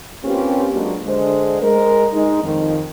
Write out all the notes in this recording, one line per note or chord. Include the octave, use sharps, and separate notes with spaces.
A#3 C4 C#4 F4 G4 B4
F#3 G#3 A#3 D4 F#4
D3 G#3 C5
G#3 A#4
G#3 D#4
F2 D#3